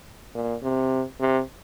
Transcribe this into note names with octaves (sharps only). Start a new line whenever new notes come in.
A#2
C3
C3